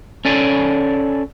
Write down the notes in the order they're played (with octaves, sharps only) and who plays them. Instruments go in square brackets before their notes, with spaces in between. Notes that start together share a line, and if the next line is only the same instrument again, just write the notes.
[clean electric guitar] C#4 A4 D5 G#5